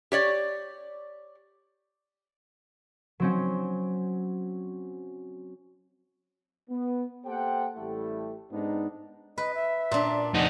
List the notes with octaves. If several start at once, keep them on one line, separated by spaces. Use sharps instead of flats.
G4 C#5 D5
F#3 C4 C#4
B3
A#3 G4 A4 C5 F#5 G5
A1 G3 A3 E4 G4 A4
G#2 B3 C4 D4 D#4
B4 D#5
E5
A#2 D4
F2 D#4 F#5